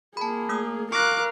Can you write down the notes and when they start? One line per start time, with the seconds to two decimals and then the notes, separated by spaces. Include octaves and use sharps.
0.17 A#3 G#4 A5 B5
0.49 A3 D#6 E6
0.92 A#4 F5 C#6 D6 F6 F#6 A#6